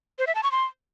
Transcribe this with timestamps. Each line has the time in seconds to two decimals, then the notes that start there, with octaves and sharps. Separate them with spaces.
0.19 C5
0.27 E5
0.35 A5
0.43 C#6
0.52 C6